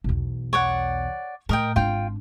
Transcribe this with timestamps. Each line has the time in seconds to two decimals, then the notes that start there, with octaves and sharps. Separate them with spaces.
0.04 B1 E2
0.53 C#5 D5 F#5
1.49 A2 A#4 D#5 G5
1.76 G#1 D4 F4 G5